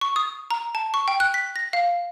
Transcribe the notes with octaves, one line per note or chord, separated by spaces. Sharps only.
C#6
D#6
A#5
A5
C#6
G5
F#6
B6
A#6
F5